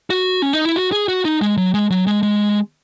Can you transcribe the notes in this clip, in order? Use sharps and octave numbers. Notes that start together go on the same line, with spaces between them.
F#4
C#4
D#4
E4
F#4
G#4
F#4
D#4
G#3
F#3
G#3
F#3
G#3
G#3